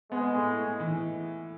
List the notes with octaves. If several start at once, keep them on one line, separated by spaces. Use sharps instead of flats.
G#3 B3
A2
A2
E3